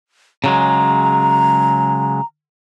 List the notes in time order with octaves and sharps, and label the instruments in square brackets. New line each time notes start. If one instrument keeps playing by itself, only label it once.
[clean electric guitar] C#3 F#3 G#3 [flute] A#5